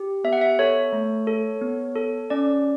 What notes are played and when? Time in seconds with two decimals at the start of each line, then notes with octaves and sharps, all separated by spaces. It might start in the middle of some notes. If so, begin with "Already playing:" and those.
Already playing: G4
0.24 B3 E5
0.33 F#5
0.41 E5
0.59 A4 C#5
0.93 A3
1.27 A4
1.62 B3
1.95 A4
2.30 C#4 D5